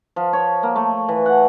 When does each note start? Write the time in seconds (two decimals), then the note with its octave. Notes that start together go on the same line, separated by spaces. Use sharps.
0.16 F3
0.33 C#5
0.63 A#3
0.76 A3
1.08 E3
1.26 F#5